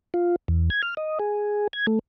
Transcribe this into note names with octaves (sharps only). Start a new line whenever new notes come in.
F4
E2
G#6
F6
D#5
G#4
G#6
A3